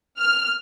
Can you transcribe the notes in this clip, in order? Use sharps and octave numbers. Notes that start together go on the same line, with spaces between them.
F6